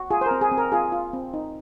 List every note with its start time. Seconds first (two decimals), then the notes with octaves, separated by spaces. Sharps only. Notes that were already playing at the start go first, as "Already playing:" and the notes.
Already playing: F#4
0.10 F4 G#4
0.21 C5
0.26 A#4
0.31 C4
0.41 G#4
0.52 C4
0.58 A#4
0.72 F4 G#4
0.92 F4
1.13 C4
1.34 D#4